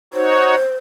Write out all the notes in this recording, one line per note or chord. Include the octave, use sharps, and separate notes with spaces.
D#4 F#4 C5 C#5